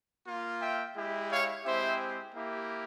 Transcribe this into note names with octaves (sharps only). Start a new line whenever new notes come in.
A#3 F4
E5 G5
G#3 E4 G4
C#5 F5
G#3 C4 E4 G4 C5 E5
A#3 E4 G4